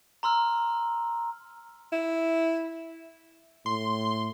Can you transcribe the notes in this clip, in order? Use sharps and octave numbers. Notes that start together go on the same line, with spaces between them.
A#5 C6 E6 F6
E4
A2 C6